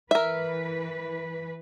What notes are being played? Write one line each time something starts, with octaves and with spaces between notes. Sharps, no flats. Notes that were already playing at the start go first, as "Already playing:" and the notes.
E3 A#4 B4 E5